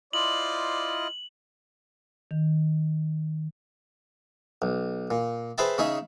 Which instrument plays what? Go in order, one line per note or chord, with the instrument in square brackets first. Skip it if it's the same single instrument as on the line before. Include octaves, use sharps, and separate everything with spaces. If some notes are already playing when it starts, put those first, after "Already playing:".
[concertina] E4 F4 D#5 [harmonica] C5 D5 C6 [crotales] F#7
[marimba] D#3
[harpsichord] B1
A#2
G#4 B4 C5 E5 G5 A5
C#3 C#4 D#4 G#4 E5